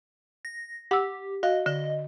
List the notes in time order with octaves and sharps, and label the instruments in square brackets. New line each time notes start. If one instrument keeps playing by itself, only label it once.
[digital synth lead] A#6
[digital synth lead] G4 [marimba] F#5 E6
[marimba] F#4 F5 [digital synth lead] D#5
[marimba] D3 [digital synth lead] D#5